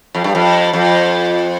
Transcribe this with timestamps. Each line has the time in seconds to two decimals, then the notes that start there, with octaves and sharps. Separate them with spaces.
0.15 F2
0.24 G2
0.35 F2
0.73 F2